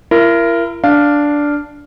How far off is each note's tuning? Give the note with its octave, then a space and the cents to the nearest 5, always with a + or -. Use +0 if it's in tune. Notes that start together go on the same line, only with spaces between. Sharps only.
E4 +40 A#4 +0
D4 -5 F5 +0